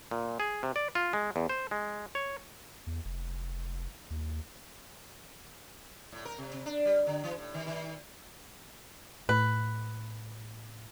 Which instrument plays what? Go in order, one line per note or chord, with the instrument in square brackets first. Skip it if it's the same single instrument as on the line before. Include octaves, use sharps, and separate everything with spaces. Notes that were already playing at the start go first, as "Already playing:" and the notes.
[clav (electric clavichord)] A#2
G#4
C3
D5
F4
G#3
E2
C5
G#3
C#5
[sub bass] E2
F1
D#2
[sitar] A2
A#4
C3
C3
D4
G3
D3
E3
A2
D#3
D#3
[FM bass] A2 [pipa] B4